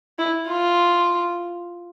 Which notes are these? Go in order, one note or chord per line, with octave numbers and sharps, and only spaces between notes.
E4
F4